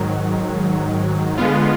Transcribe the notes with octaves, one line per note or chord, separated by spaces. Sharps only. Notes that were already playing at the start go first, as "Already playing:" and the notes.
Already playing: G#2 D#3 F#3
D3 G#3 B3 F4